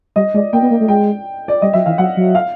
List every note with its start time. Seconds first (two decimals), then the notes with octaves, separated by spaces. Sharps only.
0.16 G3 D#5
0.34 G#3 D5
0.53 A#3 G5
0.62 B3
0.71 A#3
0.80 A3
0.88 G#3 G5
1.48 D5
1.62 G3 D#5
1.73 F#3 E5
1.86 E3 F5
1.98 F#3 F#5
2.17 F#3
2.35 F5